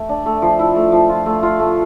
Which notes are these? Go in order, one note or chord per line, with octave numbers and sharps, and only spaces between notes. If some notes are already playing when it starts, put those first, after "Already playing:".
Already playing: A3
D4
A3
F3
E4
A3
F3
F4
A3
F4
A3